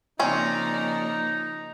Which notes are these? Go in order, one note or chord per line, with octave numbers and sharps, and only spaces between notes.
C#3 F3 A#3 C4 C#4 D#4 D5 A#5